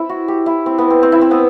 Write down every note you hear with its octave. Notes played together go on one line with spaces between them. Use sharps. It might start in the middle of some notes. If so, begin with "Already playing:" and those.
Already playing: C4 E4
F#4
G4
E4
C4
B3
C4
C4
E4
C4
B3